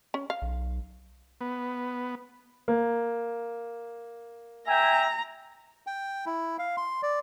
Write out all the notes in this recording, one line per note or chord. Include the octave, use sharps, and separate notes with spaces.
C#4
F5
B1
B3
A#3
E5 G5 G#5 A#5
G5
E4
F5
C6
D5